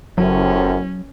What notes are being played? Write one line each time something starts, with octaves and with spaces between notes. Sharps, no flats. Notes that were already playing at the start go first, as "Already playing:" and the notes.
F#1 F#2 A2 C3 F#3 C#4